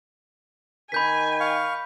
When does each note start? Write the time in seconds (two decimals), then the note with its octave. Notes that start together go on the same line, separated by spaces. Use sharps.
0.92 D#3 G#5 B5 G6 B6
1.40 F5 C#6